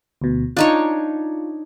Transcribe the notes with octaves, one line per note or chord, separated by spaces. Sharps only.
D2 B2
D4 D#4 F4 C#5